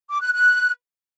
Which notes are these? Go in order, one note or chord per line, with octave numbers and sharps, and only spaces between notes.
D6
F#6
F#6